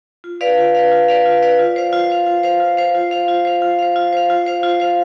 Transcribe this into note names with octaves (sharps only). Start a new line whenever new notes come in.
F4
B4 D5 F5
F4
B4 D5 F5
F4
B4 D5 F5
F4
B4 D5 F5
F4
C5 F5
F4
C5 F5
F4
C5 F5
F4
C5 F5
F4
C5 F5
F4
C5 F5
F4
C5 F5
F4
C5 F5
F4
C5 F5
F4
C5 F5